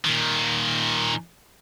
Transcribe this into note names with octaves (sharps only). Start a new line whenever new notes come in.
A#2 D#3